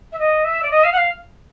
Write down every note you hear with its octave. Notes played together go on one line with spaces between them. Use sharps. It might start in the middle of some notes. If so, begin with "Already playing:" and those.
E5
D#5
E5
D5
D#5
F5
F#5
F5